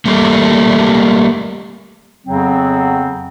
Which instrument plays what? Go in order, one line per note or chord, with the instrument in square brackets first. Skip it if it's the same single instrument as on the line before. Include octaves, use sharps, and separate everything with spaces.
[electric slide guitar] G3 A3 A#3
[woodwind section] F2 C#3 F#3 B3 C4